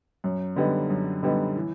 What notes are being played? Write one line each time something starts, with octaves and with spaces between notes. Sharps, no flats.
F#2
D3 G3 B3 D#4
F#2
D3 G3 B3 D#4
E3